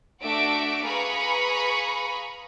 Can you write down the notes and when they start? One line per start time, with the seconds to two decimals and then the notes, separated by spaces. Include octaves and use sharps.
0.23 A3 D4 F#4 E5 D6 D7
0.86 G#4 B4 F5 A#5 B5 C#6